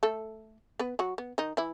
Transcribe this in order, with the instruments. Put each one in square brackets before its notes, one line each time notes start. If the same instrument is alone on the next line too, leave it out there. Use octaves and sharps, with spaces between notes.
[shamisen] A3 A4
B3 B4
F#3 F#4
B3
D#3 D#4
E3 E4